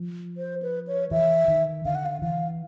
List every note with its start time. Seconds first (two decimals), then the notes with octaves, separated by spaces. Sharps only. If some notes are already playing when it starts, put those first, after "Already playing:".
Already playing: F3
0.38 C5
0.62 B4
0.87 C#5
1.11 E3 E5
1.48 D#3
1.85 D3 F5
1.95 F#5
2.06 F5
2.21 E3 F5